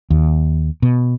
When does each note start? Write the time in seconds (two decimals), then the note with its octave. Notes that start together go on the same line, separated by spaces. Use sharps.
0.10 D#2
0.82 B2